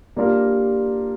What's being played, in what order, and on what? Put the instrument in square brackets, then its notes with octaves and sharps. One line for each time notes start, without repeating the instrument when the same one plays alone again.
[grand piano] G3 A#3 D4 F4 A#4